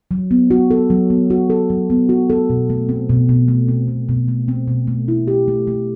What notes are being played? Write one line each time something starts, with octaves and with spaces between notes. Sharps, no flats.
F#3
B3
F#4
A4
F#3
B3
F#4
A4
F#3
B3
F#4
A4
B2
A3
C4
B2
B2
A3
C4
B2
B2
A3
C4
B2
A3
E4
G4
A3
A3